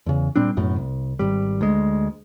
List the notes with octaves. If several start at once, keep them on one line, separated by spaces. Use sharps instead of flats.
E2 C#3
A#2 G3 C4 D4
B1 F#2 A2
C2
G#1 G3
D2 G#3